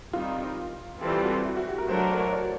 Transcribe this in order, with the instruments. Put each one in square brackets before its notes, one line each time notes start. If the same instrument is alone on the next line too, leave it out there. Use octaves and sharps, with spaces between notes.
[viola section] D#3 G3 C4 D#4 [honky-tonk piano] F4
[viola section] E3 G3 C4 F4 A4 [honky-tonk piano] G4
[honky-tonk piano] G4
F#4
E4
F#4
G4
A#4
[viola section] F#3 A3 D4 F#4 A#4 [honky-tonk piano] C5
[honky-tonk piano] C#5
D5